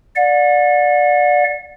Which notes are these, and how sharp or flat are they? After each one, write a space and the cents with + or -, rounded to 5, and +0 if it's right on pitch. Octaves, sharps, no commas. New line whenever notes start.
D5 +0 F#5 -40